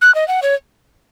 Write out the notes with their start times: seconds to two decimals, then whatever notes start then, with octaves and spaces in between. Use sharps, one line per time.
0.01 F#6
0.15 D#5
0.28 F#5
0.42 C#5